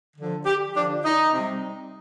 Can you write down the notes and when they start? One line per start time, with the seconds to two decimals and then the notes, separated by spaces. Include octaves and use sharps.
0.17 D3 F3
0.46 G4
0.75 D3 F3 D4
1.04 D#4
1.33 C3
1.38 G3